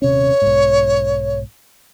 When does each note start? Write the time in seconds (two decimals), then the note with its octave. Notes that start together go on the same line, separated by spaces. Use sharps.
0.02 D#1 C3 C#4 C#5
0.42 B1 G#2